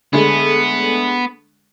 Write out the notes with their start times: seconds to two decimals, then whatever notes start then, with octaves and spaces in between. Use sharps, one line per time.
0.13 D3 G#3 A3 B3